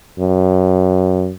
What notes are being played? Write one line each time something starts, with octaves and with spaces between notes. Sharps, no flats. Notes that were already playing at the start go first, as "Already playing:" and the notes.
F#2